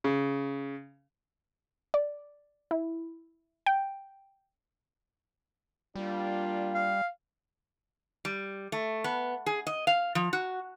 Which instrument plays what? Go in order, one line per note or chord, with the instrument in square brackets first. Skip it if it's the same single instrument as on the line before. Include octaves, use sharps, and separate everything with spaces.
[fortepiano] C#3
[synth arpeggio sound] D5
E4
G5
[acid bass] G3 [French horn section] A#3 D4 F4
[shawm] F5
[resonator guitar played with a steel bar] G3
A3
B3
G#4
D#5
F5
F3
F#4